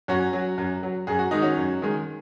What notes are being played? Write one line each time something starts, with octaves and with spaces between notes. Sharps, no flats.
F#2 C#4 F#4
F#3
F#2
F#3
F#2 G#4
F#4
D#3 G#3 D#4
C#4 F#4
F#2
D#3 G#3